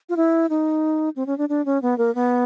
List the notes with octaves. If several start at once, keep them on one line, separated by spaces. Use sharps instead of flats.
F4
E4
D#4
C4
C#4
D4
D4
C#4
B3
A#3
B3